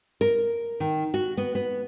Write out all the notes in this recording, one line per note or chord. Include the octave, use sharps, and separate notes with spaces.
A#4
D#3
F#4
B3
B3